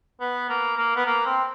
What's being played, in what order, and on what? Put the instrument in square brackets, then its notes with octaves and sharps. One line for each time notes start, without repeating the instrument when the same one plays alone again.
[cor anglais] B3
A#3
A#3
B3
A#3
C4